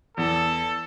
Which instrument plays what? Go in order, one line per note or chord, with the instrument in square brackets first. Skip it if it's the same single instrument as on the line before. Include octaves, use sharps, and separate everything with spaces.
[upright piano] E2 [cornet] A4